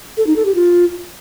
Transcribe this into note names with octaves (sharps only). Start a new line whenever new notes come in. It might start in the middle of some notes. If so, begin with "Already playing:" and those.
A4
D#4
A4
G4
F4